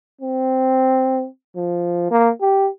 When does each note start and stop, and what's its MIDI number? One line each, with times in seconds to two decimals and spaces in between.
0.21 1.26 60
1.56 2.10 53
2.11 2.29 58
2.41 2.68 67